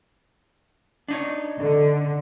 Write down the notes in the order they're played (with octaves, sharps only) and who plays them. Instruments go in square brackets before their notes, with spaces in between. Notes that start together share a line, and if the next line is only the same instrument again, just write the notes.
[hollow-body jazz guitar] D4 D#4 C#5
[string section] D3